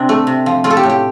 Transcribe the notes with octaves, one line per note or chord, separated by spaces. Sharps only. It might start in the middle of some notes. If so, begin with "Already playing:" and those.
Already playing: C3 C4 D4
A3
C3
F3
A3 F4
A4
G4
A2
G4